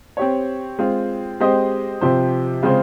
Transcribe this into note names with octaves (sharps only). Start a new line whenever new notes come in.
C4 G4 C#5
G#3 C4 F4
G#3 C4 G4 C5 D#5
C3 F3 C4 G4 C5
C#3 G#3 C4 F4 C5